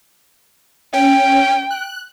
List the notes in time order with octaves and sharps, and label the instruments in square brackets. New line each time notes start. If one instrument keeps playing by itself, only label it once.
[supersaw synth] C#4 [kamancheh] G5
[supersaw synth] F#6